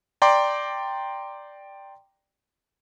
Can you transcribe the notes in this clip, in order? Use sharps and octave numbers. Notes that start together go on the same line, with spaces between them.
D5 G5 A#5 C6 D6